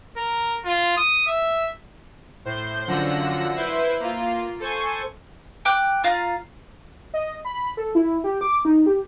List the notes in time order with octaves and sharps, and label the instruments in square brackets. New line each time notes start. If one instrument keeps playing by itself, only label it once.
[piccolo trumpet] A#4
F4
D#6
E5
[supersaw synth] A2 C5 G6
F#2 D3 F3 F#5 E6 A#6
E4 B4 C5 E5
A#3 F4
A4 C5 G#5 C#6
[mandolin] G5 D6 F#6
F4 F5 A#5
[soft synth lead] D#5
B5
A4
E4
G4
D6
D#4
G4